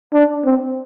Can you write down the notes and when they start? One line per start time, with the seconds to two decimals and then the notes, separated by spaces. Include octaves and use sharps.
0.13 D4
0.45 C4